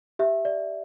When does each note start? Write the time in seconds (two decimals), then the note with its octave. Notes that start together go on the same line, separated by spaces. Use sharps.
0.19 G4 E5
0.45 D5